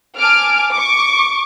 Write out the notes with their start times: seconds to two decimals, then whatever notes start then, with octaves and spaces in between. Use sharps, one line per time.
0.17 G#5 A5 D6 F6 D7
0.72 C#6 D6